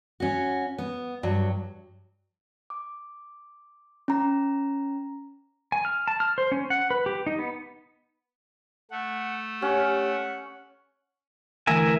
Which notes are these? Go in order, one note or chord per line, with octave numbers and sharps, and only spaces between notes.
C#4 F#4
B3
G2 F#3
D6
C#4 A#5
G#5
F6
A5
F6
C5
C#4
F#5
B4
G4
D#4
B3
A3 F#5
C#4 G4 F#5
D3 E3 A3 A#4 E5 G#5